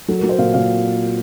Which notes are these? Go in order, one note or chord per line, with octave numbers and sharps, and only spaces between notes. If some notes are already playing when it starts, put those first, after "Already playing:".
F#3 A4
A#4
F#3
C5
A#2 F5
A#2 F5